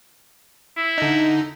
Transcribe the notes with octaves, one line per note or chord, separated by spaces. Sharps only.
E4
D3 D#4